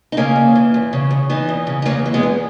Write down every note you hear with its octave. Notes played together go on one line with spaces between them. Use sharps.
D#4
C#3 A#3 C#4
E2
E3
E2
C#3
E2
E3 B3 D#4
E2
C#3
D#4
E2 A#3 C#4
E3
G#3 B3
E2